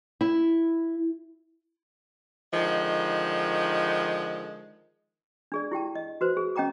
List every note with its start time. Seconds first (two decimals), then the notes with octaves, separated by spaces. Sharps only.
0.21 E4
2.53 D3 D#3 F3 G#3
5.52 D4 G#4 D5
5.72 E4 G4 G5 A5
5.95 D#5
6.21 F#4 B4 C5
6.37 G#4
6.56 C#4 D#5 G5 A#5 D6